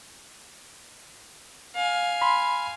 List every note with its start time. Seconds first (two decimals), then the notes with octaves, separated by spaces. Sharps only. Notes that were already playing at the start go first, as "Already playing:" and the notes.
1.75 F5 G#5
2.22 B5 C6